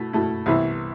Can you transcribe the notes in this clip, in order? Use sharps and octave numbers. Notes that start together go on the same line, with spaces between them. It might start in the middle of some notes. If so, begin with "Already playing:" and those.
Already playing: B2 A3 E4
B2 A3 E4
C2 C3 E3 B3 E4